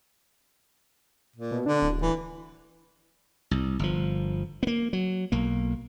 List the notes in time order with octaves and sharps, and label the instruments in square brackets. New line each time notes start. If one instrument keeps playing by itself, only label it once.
[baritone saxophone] A#2
[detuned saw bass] B2
[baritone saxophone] D3 [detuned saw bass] D4
[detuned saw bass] D1
[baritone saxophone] E3
[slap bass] C2
G1 F3
A#3 B3
F#3
B1 A#3